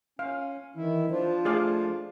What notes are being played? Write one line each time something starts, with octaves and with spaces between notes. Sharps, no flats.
C#4 F5
D#3 E3 E4
F3 D4 F4 C5
A3 G#4 D5 F5